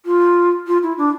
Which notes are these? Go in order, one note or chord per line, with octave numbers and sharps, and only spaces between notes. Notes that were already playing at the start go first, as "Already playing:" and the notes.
F4
F4
E4
D4